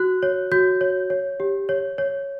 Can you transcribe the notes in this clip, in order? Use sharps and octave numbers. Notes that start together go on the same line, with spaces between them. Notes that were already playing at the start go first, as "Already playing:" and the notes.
Already playing: F#4 F#6
C#5
F#4 G6
C#5
C#5
G4
C#5
C#5